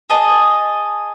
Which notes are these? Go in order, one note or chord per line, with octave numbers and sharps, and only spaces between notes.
G#4 D#5 A5